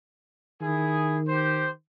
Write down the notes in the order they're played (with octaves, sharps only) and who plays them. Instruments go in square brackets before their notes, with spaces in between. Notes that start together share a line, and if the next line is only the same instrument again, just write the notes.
[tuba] D#3 [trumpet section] E4 G#4
[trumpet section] G4 C5